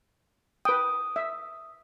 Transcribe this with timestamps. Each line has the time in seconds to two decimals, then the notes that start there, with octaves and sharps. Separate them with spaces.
0.65 B4 G5 D#6
1.16 E5